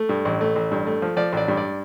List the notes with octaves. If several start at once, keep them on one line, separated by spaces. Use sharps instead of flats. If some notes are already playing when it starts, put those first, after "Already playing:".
Already playing: A3
G2
A1
A3
A1
G2
A3
F3
F3 D5
A1 D5
G2
D5